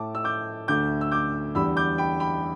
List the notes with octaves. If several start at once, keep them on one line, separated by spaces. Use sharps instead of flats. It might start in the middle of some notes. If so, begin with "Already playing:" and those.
Already playing: A2 A3 A5 D6
E6
D6 G6
D2 D3 A3 D6 G6
E6
D6 G6
E2 D3 G3 B5 E6
D6 G6
G5 B5
G5 B5